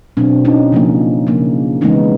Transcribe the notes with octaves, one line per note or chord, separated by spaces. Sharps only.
B2 F#3 B3 C4 D4
C#4 D#4
C#3 F3 A#3
C#3 F3 A#3
C#3 E3 G#3 B3 C#4 D#4